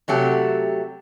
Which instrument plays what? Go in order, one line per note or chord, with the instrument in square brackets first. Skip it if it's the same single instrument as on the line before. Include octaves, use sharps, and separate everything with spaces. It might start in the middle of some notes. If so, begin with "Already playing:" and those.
[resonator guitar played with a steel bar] C3 F#3 A3 G4